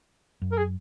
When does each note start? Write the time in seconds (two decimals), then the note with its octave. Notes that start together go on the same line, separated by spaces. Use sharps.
0.42 F#2
0.52 A#4
0.57 G#4